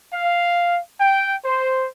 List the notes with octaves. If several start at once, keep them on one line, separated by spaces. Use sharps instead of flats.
F5
G5
C5